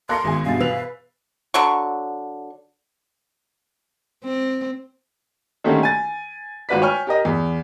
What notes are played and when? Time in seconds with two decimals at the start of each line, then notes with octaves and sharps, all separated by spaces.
0.09 A#3 A4 A#4 C6 F#6 A#6 C#7
0.24 G#1 E2 G#4 G#5
0.45 G2 B2 F5 A6
0.60 B4 E6 F7
1.54 D3 F#3 C#6
4.25 C4
5.64 D3 D#3 G3 A3 A#3 C#4
5.83 G#5 A6
6.69 G#1 F4 F#4 B4 D5 B6
6.82 C#5 G5 G#5 C#6 F6
7.07 G4 A#4 D#5
7.25 E2